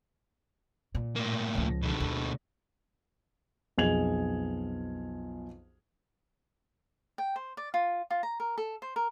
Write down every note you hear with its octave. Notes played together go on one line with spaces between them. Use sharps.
A#2
A2 A#3
C#2 F3
B2 D3
D2
B1 F2 G#4 G#6 F7 F#7
G5
C5
D5
F4
F4
A#5
A#4
A4
C5
A#4